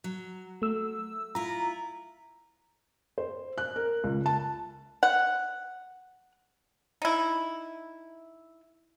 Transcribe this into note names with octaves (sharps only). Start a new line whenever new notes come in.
F#3
A3 E6
E4 F4 A#5
C5
F#6
A#4
C#2
A5
F#5
D#4 E4